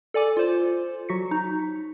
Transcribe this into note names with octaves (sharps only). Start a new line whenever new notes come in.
A4 D5 G#5 D6
F4 C5
F#3 F#4 B6 C#7
D#4